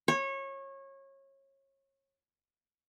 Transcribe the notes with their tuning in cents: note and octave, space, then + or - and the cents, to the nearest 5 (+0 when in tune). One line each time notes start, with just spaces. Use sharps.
C#5 -25